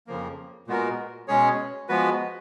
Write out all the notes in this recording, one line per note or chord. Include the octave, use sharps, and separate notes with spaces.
F2 C#3 F3 A#3
A#2 G#3 B3 F#4 A#4
B2 G#3 C#4 G#4 C#5
F3 G#3 B3 F#4 B4